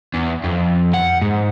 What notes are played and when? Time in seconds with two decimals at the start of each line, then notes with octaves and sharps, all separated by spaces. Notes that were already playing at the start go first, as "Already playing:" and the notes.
0.14 E2
0.44 F2
0.94 F#5
1.22 G#2